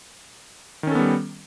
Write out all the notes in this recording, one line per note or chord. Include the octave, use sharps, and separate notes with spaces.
D#3 G3 B3 C#4 A4